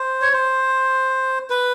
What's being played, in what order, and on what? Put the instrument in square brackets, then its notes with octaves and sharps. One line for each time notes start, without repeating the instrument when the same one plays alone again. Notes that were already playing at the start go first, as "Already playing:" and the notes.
Already playing: [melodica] C5
C#5
C5
B4